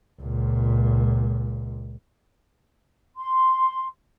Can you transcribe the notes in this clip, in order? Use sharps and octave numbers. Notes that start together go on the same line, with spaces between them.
C#2 A#2
C6